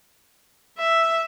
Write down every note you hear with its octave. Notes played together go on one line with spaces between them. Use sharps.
E5